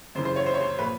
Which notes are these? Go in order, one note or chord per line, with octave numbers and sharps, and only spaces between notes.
F#2 C#3 E3 C5
C5
C#5
C5
C#5
C5
A#2 F3 B4